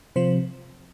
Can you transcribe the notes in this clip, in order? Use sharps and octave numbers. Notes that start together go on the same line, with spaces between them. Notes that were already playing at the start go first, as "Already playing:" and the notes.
C3 F3 C5